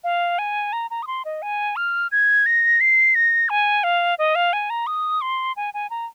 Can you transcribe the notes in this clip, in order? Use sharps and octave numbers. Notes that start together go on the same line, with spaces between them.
F5
G#5
A#5
A#5
D#6
C6
D#5
G#5
F6
G#6
A#6
C7
A#6
G#5
F5
D#5
F5
G#5
A#5
D#6
C6
G#5
G#5
A#5